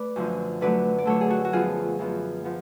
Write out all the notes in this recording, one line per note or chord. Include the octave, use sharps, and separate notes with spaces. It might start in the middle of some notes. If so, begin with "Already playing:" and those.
Already playing: A3 B4 D5
F#2 D3 F3
D3 F#3 A3 B4 D5
D5
D3 F#3 A3 A4 C#5
G#4
F#4 A4
F#4
F#2 F3 B3 F4 G#4
F#2 F3 B3
F3 B3